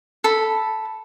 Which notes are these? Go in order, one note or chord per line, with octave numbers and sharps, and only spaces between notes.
A4 B5